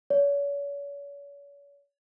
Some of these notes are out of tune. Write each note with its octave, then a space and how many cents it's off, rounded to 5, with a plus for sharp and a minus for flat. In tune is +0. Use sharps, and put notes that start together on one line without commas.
C#5 +40